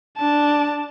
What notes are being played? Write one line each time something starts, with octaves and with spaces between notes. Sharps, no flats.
D4 A5